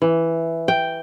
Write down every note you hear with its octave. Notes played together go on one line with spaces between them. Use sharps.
E3
G5